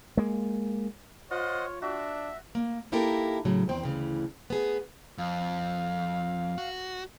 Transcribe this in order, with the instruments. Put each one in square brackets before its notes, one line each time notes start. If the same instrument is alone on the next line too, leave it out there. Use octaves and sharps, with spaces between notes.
[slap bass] G#3 A#3
[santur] F4 [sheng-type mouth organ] C5 D#5 F#5 [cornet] C#5
[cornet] D4 [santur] F#4 [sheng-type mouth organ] E5
[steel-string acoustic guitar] A#3
A#3 D#4 E4 G4 A4 A#4
A2 C#3 F#3
E2 D#3 C4 C5 G5
D2 C#3 E3
B3 G#4
[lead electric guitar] F2 [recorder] F5
[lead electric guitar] F#4